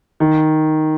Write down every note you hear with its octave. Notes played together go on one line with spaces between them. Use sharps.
D#3